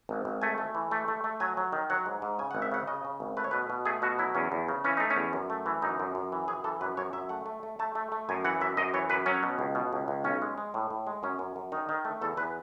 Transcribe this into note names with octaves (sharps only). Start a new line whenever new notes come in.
G#1
G#1
A3 G#5
A3
E3
A3
A3
A3
F#3 G#5
F#3
D#3
F#3 F#5
G#2
G#2
C#3 G#5
G#1 F#5
E5
C#3 F#5
C#3 D#5
C#3
G#1
A3 B4
C#5
B2 B4
B2
A3 G#4
B2 F#4
F#3 E4
E2 C#4
E2
C#3
E3 C#4
A3 D#4
C#4
E2
F#2
A3
E3
F#2 D#4
F#2
F#2
E3
F#2 G#4
E3 A4
F#2 B4
F#2 C#5
F#2 E5
A3 F#5
A3
A3
A3 A5
A3
A3
F#2 G#5
E3 F#5
F#2 E5
F#2 D#5
E3 C#5
F#2 B4
F#3 C#4
B2
C#2
B2
C#2
C#2
B1 C#4
G#3
G#3
A2
A2
G#3
F#2 C#4
F#2
F#2
D#3 D#4
D#3
A3
E2 A4
E2 B4